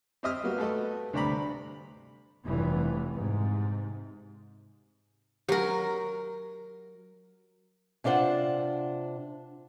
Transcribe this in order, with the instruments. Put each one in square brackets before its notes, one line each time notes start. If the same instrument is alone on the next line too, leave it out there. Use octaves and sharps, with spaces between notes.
[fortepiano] C4 G4 D#5 E5 D#6 F6
G3 A#3 B3 F#4 G4
A3 F#4 G4 A4 B4 D#5
D2 G2 C3 D5 A#5 B5
[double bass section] F1 G2 E3
G#2 C3
[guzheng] F#3 A#4 [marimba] G4
[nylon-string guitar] C3 D4 F4 C5 F#5